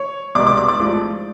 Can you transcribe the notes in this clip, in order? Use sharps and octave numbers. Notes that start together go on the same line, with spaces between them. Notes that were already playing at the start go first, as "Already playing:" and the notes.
Already playing: C#5 C#6
C2 B2 G#3 B3 D5 D6
D5 D6
D5 D6
D5 D6
G#1 G#2 F3 A3